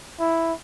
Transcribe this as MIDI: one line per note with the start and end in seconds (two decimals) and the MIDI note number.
0.20 0.53 64